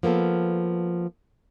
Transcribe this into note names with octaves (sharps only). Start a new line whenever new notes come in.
F3 A#3 B3 A4